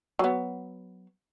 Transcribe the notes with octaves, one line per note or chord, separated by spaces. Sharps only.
F#3 B3